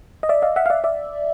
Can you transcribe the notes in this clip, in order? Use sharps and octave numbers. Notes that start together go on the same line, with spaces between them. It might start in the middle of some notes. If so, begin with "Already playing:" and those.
D#5
D5 E5
D#5 F5
E5 F#5
F5
D5 E5
D5 E5